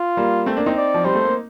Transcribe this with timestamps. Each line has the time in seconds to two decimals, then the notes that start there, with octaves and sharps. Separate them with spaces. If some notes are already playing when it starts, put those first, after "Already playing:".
Already playing: F4
0.17 G3 A#3
0.46 A3 C4
0.57 A#3 D4
0.66 C4 D#4
0.77 D5
0.94 F3
1.04 G3 C5
1.15 A3
1.25 A#3